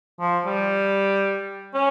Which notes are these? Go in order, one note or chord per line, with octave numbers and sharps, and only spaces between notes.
F3
G3
C#4